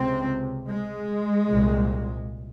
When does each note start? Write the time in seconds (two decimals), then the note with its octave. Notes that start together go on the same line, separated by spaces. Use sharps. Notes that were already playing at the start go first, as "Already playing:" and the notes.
Already playing: C#2 C3 C4
0.70 G#3
1.50 C2 A#2